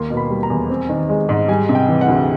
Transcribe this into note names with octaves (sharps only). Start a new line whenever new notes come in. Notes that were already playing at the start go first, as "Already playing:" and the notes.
Already playing: D#2 A#3 C6
B2
B5
G3
A#5
E2
C4
D#3
G#3
G#2
G3 G#5
C3
G5
E3
F#5
D2